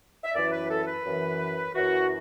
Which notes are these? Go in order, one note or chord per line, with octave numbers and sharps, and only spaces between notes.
E5
F#2 E3 D5
B4
A4
B4
F#2 E3
F#2 E3 F#4